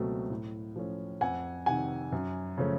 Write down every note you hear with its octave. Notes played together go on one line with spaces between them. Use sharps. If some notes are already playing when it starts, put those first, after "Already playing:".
Already playing: C#2 B2 F#3 A3 C4
A2
F3 A3 C#4
F2 F#5 G#5
C3 D#3 F#5 G#5
F#2
C#3 F3 A3 C#4